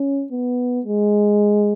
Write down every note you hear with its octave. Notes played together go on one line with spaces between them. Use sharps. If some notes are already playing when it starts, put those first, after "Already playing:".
Already playing: C#4
B3
G#3